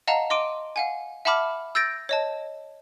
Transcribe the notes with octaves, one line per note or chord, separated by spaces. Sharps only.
D#5 F5 F#5 A5 A#5
D#5 C6 D6 D7 D#7
F5 F#5 G#5
E5 F#5 A5 B5 D6 F6
E6 G6 A6 A#6 D7
C#5 D#5 A5